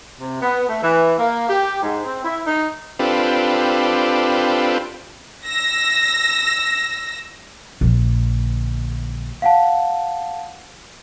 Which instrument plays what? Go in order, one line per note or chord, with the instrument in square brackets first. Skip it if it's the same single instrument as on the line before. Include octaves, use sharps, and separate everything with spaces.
[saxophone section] C3
B3
A3
E3
A#3
G4
G#2
C4
E4
D#4
[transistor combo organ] C4 D4 F4 G4 A4 B4
[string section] E6 A#6
[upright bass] A#1 D3
[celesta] F5 F#5 A5